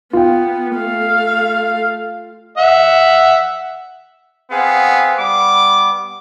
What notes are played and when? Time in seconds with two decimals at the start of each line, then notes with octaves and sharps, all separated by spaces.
0.13 B3 F4 G5
0.76 A3 F5
2.58 E5 F#5
4.51 B3 C4 G#4 F5
5.19 G3 B3 D6